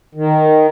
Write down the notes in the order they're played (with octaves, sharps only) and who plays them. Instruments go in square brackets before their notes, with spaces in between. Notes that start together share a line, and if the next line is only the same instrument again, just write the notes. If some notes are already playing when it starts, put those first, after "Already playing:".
[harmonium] D#3